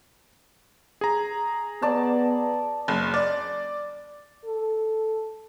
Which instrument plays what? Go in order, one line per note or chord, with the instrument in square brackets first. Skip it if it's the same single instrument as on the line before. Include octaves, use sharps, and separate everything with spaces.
[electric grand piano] G#4 A#5
[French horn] B3 [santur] D5 A5
[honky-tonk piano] F#1
D5
[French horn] A4